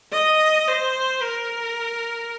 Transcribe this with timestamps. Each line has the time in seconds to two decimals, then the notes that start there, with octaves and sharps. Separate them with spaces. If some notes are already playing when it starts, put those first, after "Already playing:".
0.12 D#5
0.68 C5
1.22 A#4